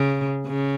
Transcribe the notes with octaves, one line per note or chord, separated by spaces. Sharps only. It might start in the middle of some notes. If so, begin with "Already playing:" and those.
Already playing: C#3
C#3